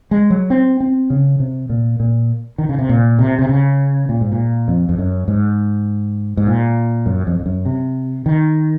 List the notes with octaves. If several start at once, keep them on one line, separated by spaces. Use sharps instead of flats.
G#3
F#3
C4
C4
C#3
C3
A#2
A#2
D#3
C#3
C3
A#2
C3
C3
C#3
A#2
G#2
A#2
F2
F2
F#2
G#2
G#2
A#2
F#2
F2
F2
F#2
C3
D#3